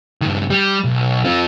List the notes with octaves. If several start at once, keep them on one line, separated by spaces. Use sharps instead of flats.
G2 D#3
G3
B1
C4 F4